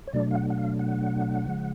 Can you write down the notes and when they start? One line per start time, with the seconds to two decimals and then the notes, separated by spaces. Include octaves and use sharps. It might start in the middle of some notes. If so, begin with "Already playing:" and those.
0.08 C#5
0.13 B2 F#3 A3 D4 D5
0.31 F5
0.35 F#5
0.50 F#5
0.58 F5
0.79 F#5
1.46 C#3 F3 G#3